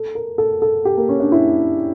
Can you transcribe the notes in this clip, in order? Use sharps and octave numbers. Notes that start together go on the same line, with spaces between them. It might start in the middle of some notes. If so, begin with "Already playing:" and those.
Already playing: A4
A#4
A4
A4
G4
A#3
C#4
D4
E4